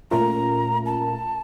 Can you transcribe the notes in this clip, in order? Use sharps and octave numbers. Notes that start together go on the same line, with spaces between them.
A#2 A3 C#4 F4 A#4 A#5
A5